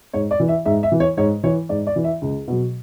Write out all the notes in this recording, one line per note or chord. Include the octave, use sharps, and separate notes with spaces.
G#2 C#5
D5
E3
E5
G#2 E5
E5
E3
C#5
G#2 C#5
E3 C#5
G#2 D5
D5
E3
E5
C#2
B2 F#3